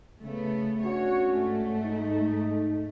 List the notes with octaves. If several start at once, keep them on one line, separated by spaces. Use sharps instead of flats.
C#3 A3 B3
C#4 D4 F#4 C#5
G#2 A3
D#4